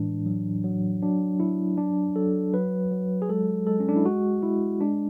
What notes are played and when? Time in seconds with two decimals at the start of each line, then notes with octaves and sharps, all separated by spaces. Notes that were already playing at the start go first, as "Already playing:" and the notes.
Already playing: A2 E3 G#3 D4
0.26 F#3
0.64 F#3
1.02 F#3 D4
1.40 F#3 E4
1.78 F#3 D4
2.16 F#3 A4
2.53 F#3 B4
2.91 F#3
3.22 G#4
3.29 G#3 A4
3.67 G#3 A4
3.80 C#4
3.89 D4
3.96 E4
4.05 G#3 F#4
4.43 G#3 E4
4.81 G#3 D4